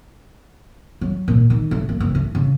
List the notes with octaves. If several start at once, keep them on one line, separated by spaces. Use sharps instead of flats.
F#3
A#2
D#3
A2
A#3
F#1
A2
C#3